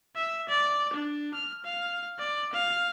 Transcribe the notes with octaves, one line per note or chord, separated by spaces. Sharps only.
E5
D5
D4
F6
F5
D5
F5